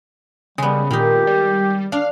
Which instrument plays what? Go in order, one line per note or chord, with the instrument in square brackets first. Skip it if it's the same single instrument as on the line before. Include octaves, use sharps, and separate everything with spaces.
[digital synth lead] C#3 [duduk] G3 [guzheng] G#3 B3
[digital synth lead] A#2 [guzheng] D#3 D#4 [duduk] G4
[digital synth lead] G3
[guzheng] D4 [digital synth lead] F5